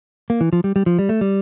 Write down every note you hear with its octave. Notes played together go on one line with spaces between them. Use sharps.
A#3
E3
F3
G3
G3
F3
G3
A3
G3